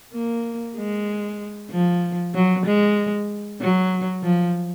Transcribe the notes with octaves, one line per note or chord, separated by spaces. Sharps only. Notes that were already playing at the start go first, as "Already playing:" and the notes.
A#3
G#3
F3
F#3
G#3
F#3
F3